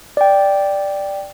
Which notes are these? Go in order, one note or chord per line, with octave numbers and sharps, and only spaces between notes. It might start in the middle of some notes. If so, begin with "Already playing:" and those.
D5 G5